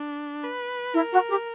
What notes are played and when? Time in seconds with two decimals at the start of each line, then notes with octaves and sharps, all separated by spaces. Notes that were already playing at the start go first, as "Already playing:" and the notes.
Already playing: D4
0.44 B4
0.94 E4 A#4
1.11 F#4
1.28 G4